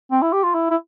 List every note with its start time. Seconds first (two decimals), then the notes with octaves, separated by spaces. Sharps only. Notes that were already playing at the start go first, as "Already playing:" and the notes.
0.11 C4
0.22 E4
0.33 G4
0.43 F4
0.54 E4
0.70 E4